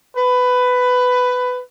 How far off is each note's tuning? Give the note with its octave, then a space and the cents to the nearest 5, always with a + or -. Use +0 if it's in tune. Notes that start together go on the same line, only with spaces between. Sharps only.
B4 +15